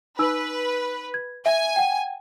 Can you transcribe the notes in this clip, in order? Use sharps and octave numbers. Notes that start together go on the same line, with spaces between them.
D#4 B4 E6
G#6
E5 G#5
F#5 G5